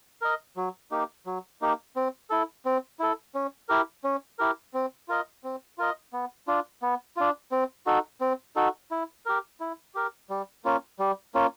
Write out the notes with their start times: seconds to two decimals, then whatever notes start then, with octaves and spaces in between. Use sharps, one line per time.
0.22 A#4 D#5
0.57 F#3
0.91 A#3 D#4 G4
1.26 F#3
1.61 A#3 D#4 G4
1.96 C4
2.30 E4 A4
2.65 C4
2.99 E4 A4
3.35 C#4
3.69 E4 G4 A#4
4.04 C#4
4.39 E4 G4 A#4
4.74 C4
5.08 F4 A#4 D#5
5.44 C4
5.78 F4 A#4 D#5
6.13 B3
6.47 D4 F4
6.82 B3
7.17 D4 F4
7.52 C4
7.87 D#4 F#4 A4
8.21 C4
8.56 D#4 F#4 A4
8.91 E4
9.26 G4 A#4
9.60 E4
9.95 G4 A#4
10.30 G3
10.65 A#3 C#4 F4
10.99 G3
11.34 A#3 C#4 F4